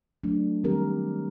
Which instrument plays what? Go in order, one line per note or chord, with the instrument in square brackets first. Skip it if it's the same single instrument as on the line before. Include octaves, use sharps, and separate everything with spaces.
[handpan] F#3 A3 D4
D#3 G3 C4 G4 A#4